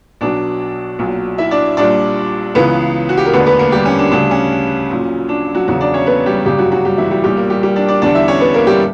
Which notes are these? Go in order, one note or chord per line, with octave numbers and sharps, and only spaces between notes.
B1 B2 F#3 D4 D5
B1 A#2 F#3
E4 E5
D4 D5
A#1 A#2 G3 D4 D5
C#2 C#3 E3 B3 B4
F#4
G4
A#4
E1 D2 D3 B3 B4
B3 B4
A#3 A#4
G3 G4
C#4
D4
D2 C#3 G3 D4
C#4
A#1 A#2 F#3
D4
F#3 F#4
E1 E2 C#3 F#3 F#4
D4 D5
C#4 C#5
B3 B4
G3 G4
G1 F#2 C#3 G3 G4
F#3 F#4
F#3 F#4
G3 G4
E3 E4
G3 G4
B1 A#2 G3 G4
A#3 A#4
G3 G4
G3 G4
D4 D5
D4 D5
E2 D3 G3 D4 D5
E4 E5
C#4 C#5
B3 B4
A#3 A#4
G3 G4